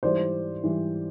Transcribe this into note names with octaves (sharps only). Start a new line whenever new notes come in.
G#2 E3 G3 C5 D5
G#2 E3 G3